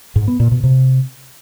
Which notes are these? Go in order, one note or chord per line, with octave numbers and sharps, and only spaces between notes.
G#2
B3
A#2
B2
C3